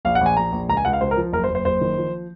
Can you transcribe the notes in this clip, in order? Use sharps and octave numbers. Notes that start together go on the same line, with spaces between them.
A#1 F5
F#5
A#1
G#5
A#1 A#5
A#1
C#2 A#5
G#5
C#2 F#5
F5
C#2 C5
A#4
F3
F#1 A#4
C5
F#1
C5
F#1 C5
D#3
F3